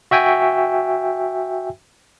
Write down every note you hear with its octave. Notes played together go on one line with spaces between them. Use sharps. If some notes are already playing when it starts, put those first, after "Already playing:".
F#4 E5 G5 G#5